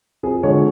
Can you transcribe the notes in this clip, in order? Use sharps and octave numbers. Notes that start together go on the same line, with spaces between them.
F2 G#4
D3 F3 G#3 C#5